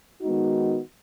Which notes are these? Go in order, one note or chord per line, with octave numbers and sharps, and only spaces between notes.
D#3 G#3 B3 D#4 F#4